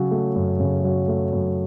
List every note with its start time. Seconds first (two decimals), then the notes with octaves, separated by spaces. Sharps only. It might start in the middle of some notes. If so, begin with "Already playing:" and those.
Already playing: C#3 F#3
0.11 A3
0.36 F#2
0.60 C#3
0.84 F#3
1.08 A3
1.33 F#2